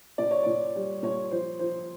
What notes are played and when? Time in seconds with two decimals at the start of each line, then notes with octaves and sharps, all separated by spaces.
0.18 A#2 D5
0.31 C#5
0.43 A#2 D5
0.76 G3
1.03 A#2 C#5
1.31 F3 C5
1.59 F3 C5